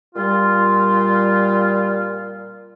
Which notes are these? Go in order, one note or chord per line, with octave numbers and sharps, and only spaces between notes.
A#2 G3 F4